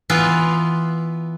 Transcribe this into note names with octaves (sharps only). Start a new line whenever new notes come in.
E3 B3 F4